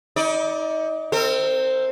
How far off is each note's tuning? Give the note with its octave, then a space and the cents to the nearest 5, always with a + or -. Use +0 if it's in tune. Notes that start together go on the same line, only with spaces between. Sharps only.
D#4 +30 D5 +0
C4 +0 A#4 -45